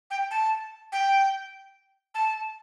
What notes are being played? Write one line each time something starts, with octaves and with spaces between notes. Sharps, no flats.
G5
A5
G5
A5